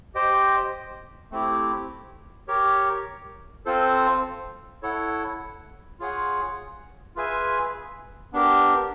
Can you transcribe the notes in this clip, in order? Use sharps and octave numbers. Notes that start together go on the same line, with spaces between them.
G4 C5 D#5 G5
A3 C4 E4 G4
G4 A#4 C#5
C4 F4 A4 C5
E4 A4 C#5 F#5
F4 G#4 C#5 F#5
F4 G#4 B4 E5 G#5
B3 D4 G4 A#4